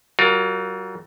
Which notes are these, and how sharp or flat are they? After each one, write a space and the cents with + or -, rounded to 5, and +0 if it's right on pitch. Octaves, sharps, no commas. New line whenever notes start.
F#3 +40 F4 +35 A#4 +0